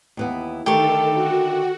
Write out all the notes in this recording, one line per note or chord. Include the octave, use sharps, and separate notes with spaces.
D#2 E3 B3
D3 D#3 A3 G4 A4 A#4 C#6
F#4